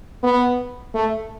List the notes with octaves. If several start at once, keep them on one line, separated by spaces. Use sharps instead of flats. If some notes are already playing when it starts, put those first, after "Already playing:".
B3
A3